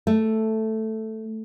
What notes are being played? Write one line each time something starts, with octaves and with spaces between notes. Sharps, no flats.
A3